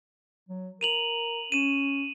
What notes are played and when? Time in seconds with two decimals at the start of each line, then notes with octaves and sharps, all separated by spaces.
0.49 F#3
0.81 A#4 D#7 F7 F#7
1.52 C#4 D#7 E7